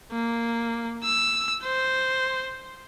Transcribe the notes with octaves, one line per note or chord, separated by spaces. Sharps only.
A#3
E6
C5